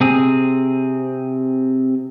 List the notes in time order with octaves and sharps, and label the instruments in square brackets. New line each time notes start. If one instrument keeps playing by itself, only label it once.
[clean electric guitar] C3 C4 G#4